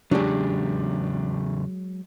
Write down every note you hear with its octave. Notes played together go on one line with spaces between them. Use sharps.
E2 C#3 F#3 G#3 D4 G4